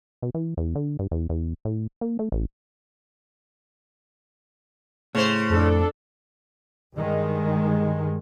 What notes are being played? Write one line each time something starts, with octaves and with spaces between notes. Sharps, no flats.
B2
E3
E2
D3
G2
E2
E2
A2
A#3
A3
A1
A2 C#3 C5
F2 D4 A4
G2 D#3 G#3